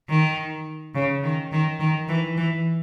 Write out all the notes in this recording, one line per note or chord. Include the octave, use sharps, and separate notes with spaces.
D#3
C#3
D#3
D#3
D#3
E3
E3